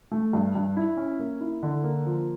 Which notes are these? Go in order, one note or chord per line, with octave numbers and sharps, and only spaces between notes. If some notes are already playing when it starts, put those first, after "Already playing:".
A3
G2
G2
E4
C#4
A#3
E4
D3
A#3
F3